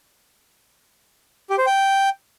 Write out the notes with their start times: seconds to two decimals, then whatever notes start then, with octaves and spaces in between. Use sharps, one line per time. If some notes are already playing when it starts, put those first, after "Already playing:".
1.50 G4
1.58 C5
1.66 G5